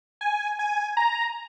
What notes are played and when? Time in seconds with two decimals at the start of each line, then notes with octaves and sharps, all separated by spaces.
0.21 G#5
0.59 G#5
0.97 A#5